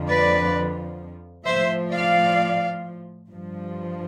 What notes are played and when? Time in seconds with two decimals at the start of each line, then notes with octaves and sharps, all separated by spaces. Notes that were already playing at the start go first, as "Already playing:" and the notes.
Already playing: F2 D3 F3
0.09 B4 D5
1.46 A2 F3 C5 E5
1.92 D5 F5
3.30 G2 F3